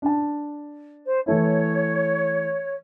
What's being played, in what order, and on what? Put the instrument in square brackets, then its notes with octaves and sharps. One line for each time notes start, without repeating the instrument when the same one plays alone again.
[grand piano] D4 A5
[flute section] C5
[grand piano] E3 A3 E4 [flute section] C#5